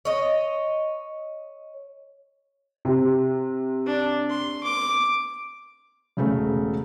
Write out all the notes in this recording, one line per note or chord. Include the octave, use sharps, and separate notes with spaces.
C#5 D#5
C3
D4
C6
D6
E1 C#3 A3